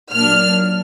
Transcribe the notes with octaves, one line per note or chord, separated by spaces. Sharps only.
A#2 F#3 A#3 D4 F6